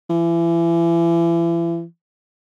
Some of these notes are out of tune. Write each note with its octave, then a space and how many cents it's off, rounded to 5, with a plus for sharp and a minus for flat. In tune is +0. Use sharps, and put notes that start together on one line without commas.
E3 +35